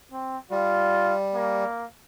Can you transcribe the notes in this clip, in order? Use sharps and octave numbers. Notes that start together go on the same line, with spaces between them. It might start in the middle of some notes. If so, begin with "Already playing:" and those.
C4
G3 F4
A#3